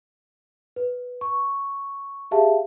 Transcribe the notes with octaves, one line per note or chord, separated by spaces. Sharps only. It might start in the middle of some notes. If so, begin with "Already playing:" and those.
B4
C#6
G4 G#4 E5 F5 A5